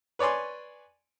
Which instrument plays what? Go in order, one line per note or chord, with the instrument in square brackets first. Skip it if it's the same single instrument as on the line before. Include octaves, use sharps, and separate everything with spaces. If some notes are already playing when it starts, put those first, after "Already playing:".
[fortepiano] B4 C#5 D5 G#5 C6